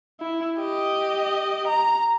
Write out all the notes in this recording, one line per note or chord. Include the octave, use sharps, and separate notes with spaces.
E4
G4 D#5
A#5